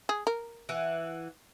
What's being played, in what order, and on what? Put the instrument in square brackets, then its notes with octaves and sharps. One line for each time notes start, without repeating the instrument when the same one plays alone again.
[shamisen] G#4
A#4
[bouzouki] E3 F#5